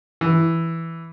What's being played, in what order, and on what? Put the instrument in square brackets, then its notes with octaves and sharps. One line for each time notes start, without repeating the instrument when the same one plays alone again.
[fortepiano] E3